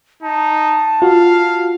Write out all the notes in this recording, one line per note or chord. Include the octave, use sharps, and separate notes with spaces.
D#4 A5
F4 F#4 F5